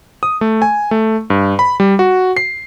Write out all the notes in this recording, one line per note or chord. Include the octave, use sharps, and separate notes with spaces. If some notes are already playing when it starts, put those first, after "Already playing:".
D#6
A3
G#5
A3
G2
B5
G3
F#4
C7